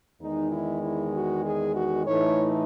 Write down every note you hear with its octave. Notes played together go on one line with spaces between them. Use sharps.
E2 D#3 G#3 D#4
E4
E4
F#4
G#4
F#4
A2 E3 A3 D#4 C#5